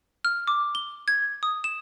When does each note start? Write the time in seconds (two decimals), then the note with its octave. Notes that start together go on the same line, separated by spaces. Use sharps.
0.25 F6
0.47 D6
0.75 G7
1.08 G#6
1.43 D#6
1.64 E7